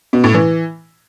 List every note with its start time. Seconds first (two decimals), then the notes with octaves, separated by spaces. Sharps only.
0.13 B2
0.24 A2
0.34 E3